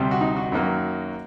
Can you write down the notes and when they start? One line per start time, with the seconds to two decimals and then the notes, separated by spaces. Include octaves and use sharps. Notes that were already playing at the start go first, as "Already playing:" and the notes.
Already playing: D2 C3 G3
0.11 F#4
0.21 D#4
0.36 F#4
0.52 F#2 D#3 F#3 A#3